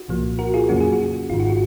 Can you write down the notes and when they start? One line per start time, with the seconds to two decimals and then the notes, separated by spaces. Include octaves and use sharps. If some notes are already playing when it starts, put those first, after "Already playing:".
Already playing: F#4
0.08 C2 A#2 F3 A#3
0.39 F#4 A#4
0.54 F4 G#4
0.69 F2 C#3 F#3 A#3 C#4 F#4
0.81 G#4
0.93 F#4
1.29 G#1 G#2 D#3 F4
1.40 F#4
1.50 F#4